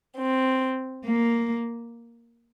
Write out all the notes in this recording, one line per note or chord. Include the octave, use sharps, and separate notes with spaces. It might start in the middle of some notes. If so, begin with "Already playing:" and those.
C4
A#3